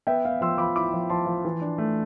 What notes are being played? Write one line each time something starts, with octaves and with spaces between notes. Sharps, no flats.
B3 E5 G5
B3 F5
F3 C6 E6
F3 B5 D6
E4 B5 D6
F3
F3 A5 C6
F3
E3
D4
A3